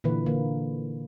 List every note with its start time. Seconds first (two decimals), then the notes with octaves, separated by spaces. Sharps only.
0.04 A#2 D3 E3 B4
0.26 D3 A#3